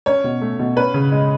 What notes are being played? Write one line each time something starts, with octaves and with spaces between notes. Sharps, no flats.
C#4 C#5
B2
A3
B2
C#4 B4
C#3
G#3